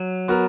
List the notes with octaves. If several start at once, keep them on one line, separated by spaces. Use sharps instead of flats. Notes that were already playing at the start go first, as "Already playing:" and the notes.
Already playing: F#3
B3 F#4 A#4